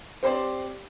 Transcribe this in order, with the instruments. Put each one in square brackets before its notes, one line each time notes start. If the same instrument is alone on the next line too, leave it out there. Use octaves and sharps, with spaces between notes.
[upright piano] C4 G4 C5 D5